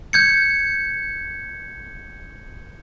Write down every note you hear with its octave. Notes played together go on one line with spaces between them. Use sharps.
G6 G#6 C#7